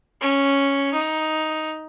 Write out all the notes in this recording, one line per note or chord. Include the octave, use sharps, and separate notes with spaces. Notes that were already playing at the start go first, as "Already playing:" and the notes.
C#4
D#4